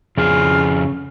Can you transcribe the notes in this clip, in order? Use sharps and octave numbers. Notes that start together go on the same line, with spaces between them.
F2 C#3 F4 G#4